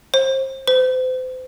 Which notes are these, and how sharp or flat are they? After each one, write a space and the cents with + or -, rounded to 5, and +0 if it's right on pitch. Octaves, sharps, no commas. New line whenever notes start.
C5 +30
C5 -35